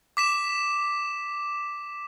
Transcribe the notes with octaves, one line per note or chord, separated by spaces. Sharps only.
D6 B6 E7